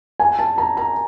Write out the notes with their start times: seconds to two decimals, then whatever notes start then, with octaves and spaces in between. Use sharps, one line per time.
0.20 G#5
0.39 A5
0.58 A#5
0.77 A#5